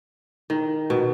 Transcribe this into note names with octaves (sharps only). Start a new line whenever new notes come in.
D#3
B2